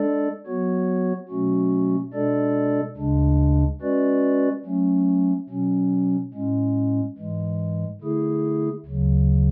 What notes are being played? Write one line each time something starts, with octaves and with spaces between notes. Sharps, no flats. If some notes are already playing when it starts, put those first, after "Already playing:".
Already playing: G#3 D4 A4 D5
F#3 B3 F#4 C#5
B2 F#3 A3 C#4 F#4
B2 G#3 D4 A4 D5
D2 C#3 G#3 D4
G#3 C#4 F#4 B4 D5
F#3 A3 C#4
B2 F#3 C#4
A2 G#3 C#4
G#2 E3 G#3
D3 A3 E4 G#4
D2 C#3 F#3